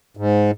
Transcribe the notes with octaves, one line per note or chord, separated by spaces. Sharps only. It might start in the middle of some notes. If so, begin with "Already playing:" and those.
G#2